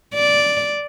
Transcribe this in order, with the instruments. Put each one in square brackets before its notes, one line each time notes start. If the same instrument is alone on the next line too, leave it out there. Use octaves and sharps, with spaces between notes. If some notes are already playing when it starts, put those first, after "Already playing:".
[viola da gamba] D5